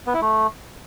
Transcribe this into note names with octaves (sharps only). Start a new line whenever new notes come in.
B3
E4
A3